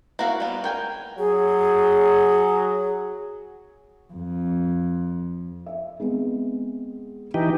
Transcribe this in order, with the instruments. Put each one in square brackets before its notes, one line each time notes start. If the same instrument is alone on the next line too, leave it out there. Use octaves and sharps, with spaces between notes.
[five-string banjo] A#3 E4 F#4 D5 F5
G3 B3
A#4 G5 G#5
[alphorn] F#3 [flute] G#4
[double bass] F2
[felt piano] E5
G#3 B3 C4
[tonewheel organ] E3 D#4 G4